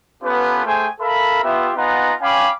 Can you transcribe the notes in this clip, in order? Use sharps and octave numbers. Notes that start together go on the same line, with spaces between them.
B3 C#4 F4 G4 A4 B4
A3 G#4 C5 G5 G#5
A4 A#4 E5 F5 B5
B3 F4 G4 E5
B3 D#4 F4 F#5 G#5 A#5
C#4 F5 G5 G#5 B5 D6